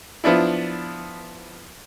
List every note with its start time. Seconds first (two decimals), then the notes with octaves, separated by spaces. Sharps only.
0.24 F3 B3 D4 E4